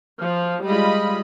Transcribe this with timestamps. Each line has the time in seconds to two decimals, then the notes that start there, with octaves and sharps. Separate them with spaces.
0.22 F3
0.66 G3 G#3 F4 D#5 B5